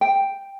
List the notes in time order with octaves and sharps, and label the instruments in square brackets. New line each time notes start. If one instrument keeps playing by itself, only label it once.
[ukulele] G5